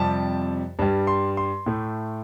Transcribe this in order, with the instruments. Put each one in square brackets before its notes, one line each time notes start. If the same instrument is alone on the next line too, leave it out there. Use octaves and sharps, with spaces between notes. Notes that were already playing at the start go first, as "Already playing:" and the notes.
Already playing: [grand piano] F2 C3 G3 A5
G2 G3
C6
C6
A2 A3